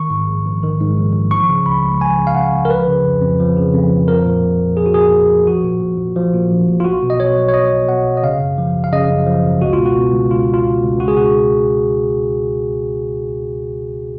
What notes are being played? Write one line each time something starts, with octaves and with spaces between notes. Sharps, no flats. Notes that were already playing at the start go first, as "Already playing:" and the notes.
Already playing: D#3 C#6
G#2
A#1
A#1
D#3
G#2
A#1
A#1
F3 C#6
C#3
C#2 B5
C#2
F3 G#5
C#3
F5
C#2 F#5
C#2
A#4
F3 B4
C#3
F2
F2
F3
C#3
F2
F2
F3 A#4
A#2
A#1
A#1
F3 G#4
F#4
A#2 G#4
A#1
A#1
F3 F#4
A#2
A#1
A#1
F3
A#2
A#1
A#1
F4
B1 F#4
B2
D#5
B2 C#5
B1
C#5
B1 D#5
B2
B2 F#5
B1
D#5
C#3 F5
F#2
F3
G#1
F5
C#3 D#5
F#2
F3
G#1
C#2 F#4
F4
B2
F#4
B2
C#2
C#2 F4
B2
F4
B2
C#2
C#2 F#4
G#4
B2 F#4